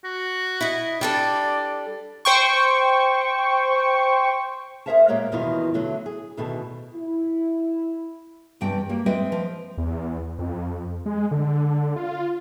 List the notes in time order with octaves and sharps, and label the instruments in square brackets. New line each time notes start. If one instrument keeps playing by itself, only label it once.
[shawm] F#4
[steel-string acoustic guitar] E4 D#5
[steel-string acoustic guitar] G3 D4 A4 [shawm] D5
[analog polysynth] C5 G5 C#6
[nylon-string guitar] G#4 A#4 C5 E5 F5 A5
A#2 G#3 A#3 G4 C#5 F#5
E2 B2 D#3 E3 G3 F4
D3 F#3 A3
G#4
D2 B2 D#3 A4 A5
[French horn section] E4
[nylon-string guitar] E2 G2 C3 G5
G3 A#3
G#3 C4 B4 D#5 E5 G5
F3
[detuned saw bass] E2
F2
G#3
D3
F4